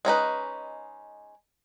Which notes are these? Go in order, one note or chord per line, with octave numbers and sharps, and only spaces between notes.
G#3 C#4 D#4 B4